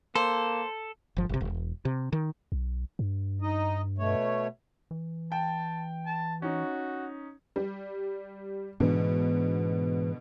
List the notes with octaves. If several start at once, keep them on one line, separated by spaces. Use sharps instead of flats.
A#3 A4 C5
G1 F3
G1 C3
E1
C3
D#3
B1
G2
D#4 D#5
B2 A3 C#5
E3
G5 A5
A5
C#4 D#4 F#4
G3
G#2 B2 D3 E3